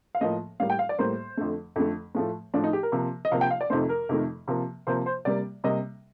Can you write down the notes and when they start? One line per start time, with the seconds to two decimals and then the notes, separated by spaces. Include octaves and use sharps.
0.15 F5
0.21 A2 F3 A#3 D#5
0.60 A2 G3 A#3 F5
0.70 G5
0.79 F5
0.89 D5
0.98 A2 G3 A#3 C5
1.37 F2 D3 A3
1.76 F2 D3 A3
2.15 A2 F3 A3
2.54 A2 F3 A3 D4
2.64 D#4
2.73 G4
2.83 A#4
2.92 C3 F3 A#3
3.25 D#5
3.31 C3 F3 A#3 F5
3.41 G5
3.51 F5
3.61 D5
3.70 F2 C3 D#3 A3 C5
3.89 A#4
4.09 F2 C3 D#3 A3
4.48 C3 F3 A#3
4.87 C3 F3 A#3 C5
5.06 C5
5.25 C3 G3 A#3 D5
5.64 C3 G3 A#3 D#5